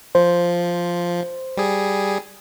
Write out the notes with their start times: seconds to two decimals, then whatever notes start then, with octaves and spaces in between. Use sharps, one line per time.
0.15 F3 C5
1.57 G3 G#4